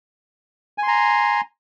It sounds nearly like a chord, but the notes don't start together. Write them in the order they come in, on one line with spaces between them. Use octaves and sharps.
G#5 C6 A#5